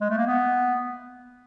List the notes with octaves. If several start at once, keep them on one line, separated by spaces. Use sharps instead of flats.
G#3
A3
A#3
B3